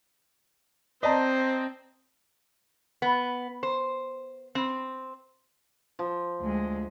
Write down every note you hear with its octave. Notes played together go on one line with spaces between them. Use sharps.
C4 C5 D5 D#5 A5 A#5
B3
C5
C4
F3
D2 G#3